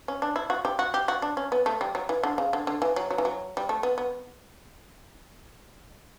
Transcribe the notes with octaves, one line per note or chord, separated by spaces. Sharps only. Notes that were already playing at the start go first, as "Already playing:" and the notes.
C#4
D4
E4
F#4
G4
F#4
G4
F#4
D4
C#4
B3
A3
G3
F#3
E3
D3
C#3
D3
D3
E3
F#3
F#3
E3
F#3
G3
A3
B3
B3